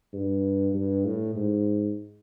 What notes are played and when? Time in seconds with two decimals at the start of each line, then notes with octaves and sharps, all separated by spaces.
0.13 G2
0.74 G2
1.05 A2
1.36 G#2